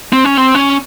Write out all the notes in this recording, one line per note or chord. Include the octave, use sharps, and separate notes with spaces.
C4
C#4
C4
C#4